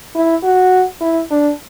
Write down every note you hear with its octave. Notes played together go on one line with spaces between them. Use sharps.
E4
F#4
E4
D4